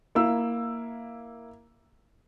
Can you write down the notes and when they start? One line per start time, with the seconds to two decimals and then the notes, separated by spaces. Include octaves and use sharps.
0.15 A#3 E4 E6